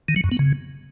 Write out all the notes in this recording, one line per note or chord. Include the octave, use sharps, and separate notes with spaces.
D#3
F#3
F#2
B3
C#3